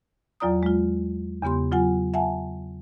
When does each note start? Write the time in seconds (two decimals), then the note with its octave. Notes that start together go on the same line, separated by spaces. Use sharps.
0.40 E2 F#3 F4 D5 A#5 D#6
0.63 G#3 F4
1.42 E2 C#3 B3 G4 C6
1.72 F#3 F4 F#5 G#5
2.14 E5 F#5 G#5 A5